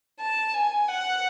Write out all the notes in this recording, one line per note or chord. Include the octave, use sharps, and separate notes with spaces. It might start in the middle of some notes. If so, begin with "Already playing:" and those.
A5
G#5
F#5